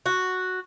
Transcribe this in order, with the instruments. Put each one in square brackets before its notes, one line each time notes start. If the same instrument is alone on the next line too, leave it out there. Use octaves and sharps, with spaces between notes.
[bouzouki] F#4